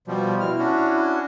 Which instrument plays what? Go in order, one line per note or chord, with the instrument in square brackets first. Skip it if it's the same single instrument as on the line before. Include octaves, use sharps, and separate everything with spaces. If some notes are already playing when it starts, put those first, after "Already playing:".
[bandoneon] B2 F3 G3
[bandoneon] B2 F6 [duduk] E4
[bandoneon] C#4 D4 F#4